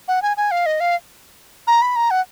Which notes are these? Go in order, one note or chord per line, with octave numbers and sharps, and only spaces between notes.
F#5
G#5
G#5
F5
D#5
F5
A#5
B5
A#5
F#5